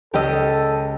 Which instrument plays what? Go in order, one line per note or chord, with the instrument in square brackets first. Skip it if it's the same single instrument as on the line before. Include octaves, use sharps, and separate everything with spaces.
[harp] C#2 E6 F6 [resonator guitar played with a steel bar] G4 D#5 [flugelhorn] A4